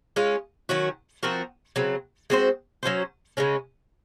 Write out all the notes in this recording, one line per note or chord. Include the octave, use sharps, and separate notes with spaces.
G#3 C#4 F4
D#3 F#3 C#4 F#4
F3 C4 F#4 A#4
C#3 F#3 C4
G#3 C4 F#4 C5
F#3 C#4 F#4 C5
C#3 G#3 C#4